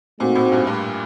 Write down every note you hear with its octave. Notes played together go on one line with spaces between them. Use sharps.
A#2 A3 C4 D#4 F#4 C5
A2
G2
G2